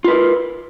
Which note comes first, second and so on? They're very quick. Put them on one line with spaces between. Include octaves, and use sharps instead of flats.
F4 B4 A#4